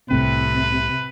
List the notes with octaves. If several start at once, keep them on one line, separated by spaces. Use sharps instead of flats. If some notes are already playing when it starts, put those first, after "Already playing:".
C2 A2 C3 C4 B4